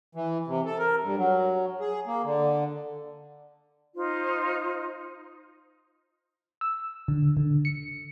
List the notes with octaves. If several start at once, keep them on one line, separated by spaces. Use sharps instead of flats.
E3
C3
A4
A#4
G2
F#3
G#4
A#3
D3
D#4 F4 C5
E6
D3
D3
C#7